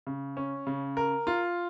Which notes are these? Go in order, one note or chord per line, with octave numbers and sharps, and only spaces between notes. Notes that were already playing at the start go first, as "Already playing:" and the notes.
C#3
C#4
C#3
A#4
F4